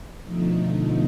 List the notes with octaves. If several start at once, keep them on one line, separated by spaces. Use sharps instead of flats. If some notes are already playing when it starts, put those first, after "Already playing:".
B2 D3 F3 A3 D#4